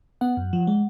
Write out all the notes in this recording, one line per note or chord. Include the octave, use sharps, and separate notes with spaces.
B3 F#5
F#2
F3
G#3